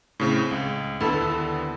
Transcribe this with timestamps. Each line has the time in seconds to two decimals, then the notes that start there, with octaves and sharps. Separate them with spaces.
0.20 A2 C#3 C4
0.51 C#2
1.00 D#2 D3 B3 E4 A4